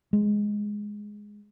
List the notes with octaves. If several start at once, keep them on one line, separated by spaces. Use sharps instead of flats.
G#3